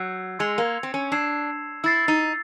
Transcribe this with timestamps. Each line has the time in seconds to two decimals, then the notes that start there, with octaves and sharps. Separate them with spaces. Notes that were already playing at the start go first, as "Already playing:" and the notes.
Already playing: F#3 E6 G6 C7
0.39 G#3 C6 E6 G#6 C#7 F7
0.58 A#3
0.83 C4
0.94 C#4
1.12 D4 E6 G#6 C7 E7
1.84 E4 E6 A6 C7
2.08 D#4